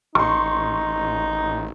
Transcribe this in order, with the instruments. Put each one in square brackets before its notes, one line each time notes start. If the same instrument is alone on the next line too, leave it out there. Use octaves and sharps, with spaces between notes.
[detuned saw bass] A1 [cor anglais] D#4 [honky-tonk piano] C6 C#6